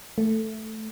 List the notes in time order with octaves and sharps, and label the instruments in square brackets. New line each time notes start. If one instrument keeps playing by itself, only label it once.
[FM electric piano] A3